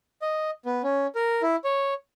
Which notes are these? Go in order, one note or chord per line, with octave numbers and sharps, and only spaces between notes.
D#5
B3
C#4
A#4
E4
C#5